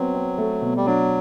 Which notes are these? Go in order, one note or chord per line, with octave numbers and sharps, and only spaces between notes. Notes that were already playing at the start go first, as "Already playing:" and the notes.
Already playing: F#3 B3 C4
C4
A3
B2
G3
F#3 D4